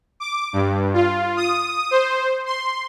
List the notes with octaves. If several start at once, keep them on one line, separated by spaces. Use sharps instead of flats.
D6
G2
F4
D#6
C5
C6